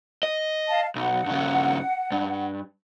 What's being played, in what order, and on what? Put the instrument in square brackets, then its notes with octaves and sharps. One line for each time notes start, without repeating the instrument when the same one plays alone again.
[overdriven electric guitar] D#5
[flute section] F5 A5
[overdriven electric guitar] B1 [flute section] F#5
[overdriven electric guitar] G2 C#3
G2